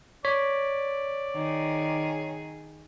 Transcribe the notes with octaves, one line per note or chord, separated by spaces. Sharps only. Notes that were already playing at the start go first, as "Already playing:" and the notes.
C#5 D5 B6
D#3 G#4